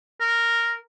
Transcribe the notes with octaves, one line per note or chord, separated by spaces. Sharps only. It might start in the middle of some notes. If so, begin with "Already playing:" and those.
A#4